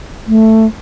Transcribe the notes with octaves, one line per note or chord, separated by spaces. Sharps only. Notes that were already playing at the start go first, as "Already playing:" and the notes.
A3